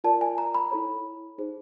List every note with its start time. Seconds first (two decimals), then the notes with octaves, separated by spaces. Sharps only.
0.04 F4 A#4 D5 A5
0.21 G#5
0.38 A#5
0.54 B5
0.71 E4 A4 C#5
1.38 D#4 G#4 C5